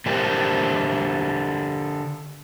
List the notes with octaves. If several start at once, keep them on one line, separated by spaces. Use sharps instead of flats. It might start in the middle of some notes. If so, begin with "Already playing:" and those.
D3 D4 G4 A#4 C5